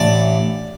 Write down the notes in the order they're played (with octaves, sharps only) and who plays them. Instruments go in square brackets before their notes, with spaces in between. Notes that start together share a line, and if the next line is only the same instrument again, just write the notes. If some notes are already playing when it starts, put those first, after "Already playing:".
Already playing: [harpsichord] A1 A2 E3 D4 D5